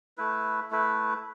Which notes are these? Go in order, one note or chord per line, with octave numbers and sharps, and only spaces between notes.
A3 E4 B4
A3 E4 B4